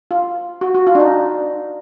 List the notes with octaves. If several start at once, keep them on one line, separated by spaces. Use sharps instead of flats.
F4
F#4
F#4
F4
D4
D#4